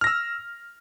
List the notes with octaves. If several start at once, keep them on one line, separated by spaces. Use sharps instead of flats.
E6 F6 A#6